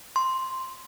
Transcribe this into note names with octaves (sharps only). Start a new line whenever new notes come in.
C6